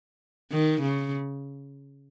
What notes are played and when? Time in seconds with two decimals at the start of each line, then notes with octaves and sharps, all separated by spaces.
0.52 D#3
0.81 C#3